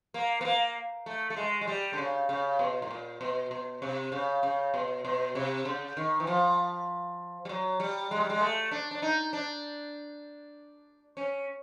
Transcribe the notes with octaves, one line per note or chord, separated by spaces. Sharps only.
A#3
B3
A#3
A3
A3
G#3
G#3
G3
D3
C#3
C#3
B2
A2
A#2
B2
B2
C3
C#3
C#3
B2
B2
C3
C#3
D#3
E3
F3
G3
F#3
G3
G#3
G3
G#3
A3
D4
D4
D#4
D4
C#4